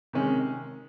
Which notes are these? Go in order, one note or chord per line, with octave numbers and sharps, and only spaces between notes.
C3 D#3 G#3 C#4